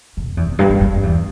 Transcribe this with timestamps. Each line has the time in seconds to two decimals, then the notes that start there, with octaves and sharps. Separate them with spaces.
0.17 D3
0.26 F2
0.37 E2
0.48 E2
0.59 G2
0.70 G2
0.81 G2
0.92 F2
1.03 E2